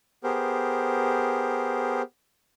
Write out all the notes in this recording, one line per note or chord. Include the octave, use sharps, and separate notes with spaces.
B3 G4 G#4 A#4 C5